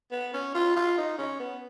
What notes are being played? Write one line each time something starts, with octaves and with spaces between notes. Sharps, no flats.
B3
C#4
F4
F4
D#4
C#4
B3